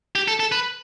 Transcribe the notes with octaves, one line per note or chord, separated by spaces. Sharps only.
G4
A4
A4
B4